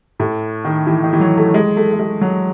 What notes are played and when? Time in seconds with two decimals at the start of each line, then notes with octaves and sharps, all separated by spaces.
0.20 A2
0.65 D#3
0.87 E3
1.04 D#3
1.13 E3
1.20 F#3
1.37 A3
1.54 G#3
1.77 A3
1.93 A3
1.99 G#3
2.21 F#3